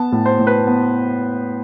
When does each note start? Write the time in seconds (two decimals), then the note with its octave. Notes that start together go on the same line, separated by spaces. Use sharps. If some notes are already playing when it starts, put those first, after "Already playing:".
Already playing: B3 A5
0.12 A2
0.26 C5
0.39 A2
0.47 B4
0.67 B3